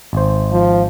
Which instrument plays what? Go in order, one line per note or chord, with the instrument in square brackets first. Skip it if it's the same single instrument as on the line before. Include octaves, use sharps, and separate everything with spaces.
[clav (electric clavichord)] G#1 C5
[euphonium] F3